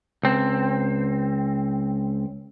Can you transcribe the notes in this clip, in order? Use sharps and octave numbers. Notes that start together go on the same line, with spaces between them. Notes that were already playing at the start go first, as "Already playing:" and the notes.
C#2 C4